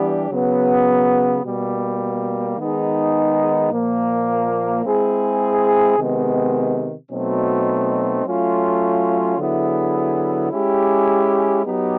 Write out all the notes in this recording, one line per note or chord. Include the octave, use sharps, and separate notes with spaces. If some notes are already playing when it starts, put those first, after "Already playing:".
Already playing: E3 G3 B3 D4 G4
C#3 F#3 B3
B2 G3 A#3
D#3 G#3 B3 D#4 G#4
A#2 F3 A#3
G#3 C4 E4 G#4
C3 D#3 G#3 B3
B2 F#3 A3 C4 D#4
F#3 A3 C#4 F4
D3 F#3 B3 E4 G#4
G#3 C#4 E4 G4
F#3 B3 D#4 G4